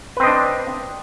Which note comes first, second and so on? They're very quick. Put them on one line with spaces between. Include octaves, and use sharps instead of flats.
B4 C4 D#5 D4